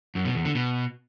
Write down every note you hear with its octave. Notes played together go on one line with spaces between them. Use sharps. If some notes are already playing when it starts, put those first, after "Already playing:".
F#2
B2
E2
D3
B2